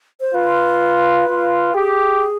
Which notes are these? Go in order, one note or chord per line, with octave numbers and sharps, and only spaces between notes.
C5
F4 B4
F4
G4 G#4